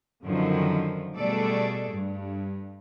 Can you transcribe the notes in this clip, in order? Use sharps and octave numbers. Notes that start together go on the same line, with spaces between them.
F#2 D3 D#3 F3
B2 G3 A3 G#4 A4 D5
G2